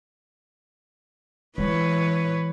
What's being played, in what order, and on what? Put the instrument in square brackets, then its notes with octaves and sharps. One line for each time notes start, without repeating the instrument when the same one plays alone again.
[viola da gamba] E3 B4 C#5 [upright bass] G#3